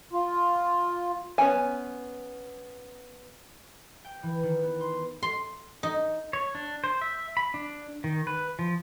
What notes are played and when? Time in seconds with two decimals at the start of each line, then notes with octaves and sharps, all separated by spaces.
0.13 F4
1.38 B3 C#4 G#5
4.05 G5
4.23 E3
4.43 D#3
4.63 B3
4.81 C6
5.23 C6
5.83 D#4
6.33 C#5
6.55 D4
6.84 C5
7.02 E5
7.37 B5
7.54 D4
8.04 D#3
8.27 B4
8.59 F3